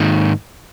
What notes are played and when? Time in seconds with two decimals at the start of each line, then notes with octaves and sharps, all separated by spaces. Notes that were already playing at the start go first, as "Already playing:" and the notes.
Already playing: G#2 D#3 A#3 D#4